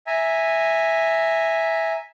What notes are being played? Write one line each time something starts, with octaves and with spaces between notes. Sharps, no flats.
E5 G#5 A#5